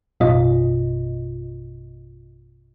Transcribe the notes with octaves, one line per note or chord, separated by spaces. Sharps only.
A1 F#2 B2 F4 D#5